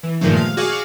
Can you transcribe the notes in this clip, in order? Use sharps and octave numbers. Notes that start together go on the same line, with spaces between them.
E3
G2 A#2 D#3 F3 G#3 A3
F5
F#4 G#4 D5 F5 C#6